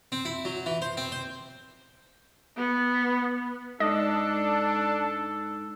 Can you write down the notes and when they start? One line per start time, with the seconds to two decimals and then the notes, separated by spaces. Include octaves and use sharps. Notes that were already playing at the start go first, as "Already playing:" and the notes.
0.12 C4
0.25 E4
0.45 F#3
0.66 E3
0.82 C5
0.97 C4
1.12 C5
2.57 B3
3.80 G#2 D4 A4 D#5